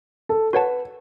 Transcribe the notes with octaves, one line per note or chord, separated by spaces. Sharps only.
A4
F#4 B4 C#5 F#5 A5